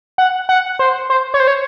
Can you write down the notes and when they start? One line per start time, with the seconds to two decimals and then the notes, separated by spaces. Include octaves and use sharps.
0.18 F#5
0.49 F#5
0.79 C5
1.10 C5
1.34 C#5
1.40 C5
1.48 C#5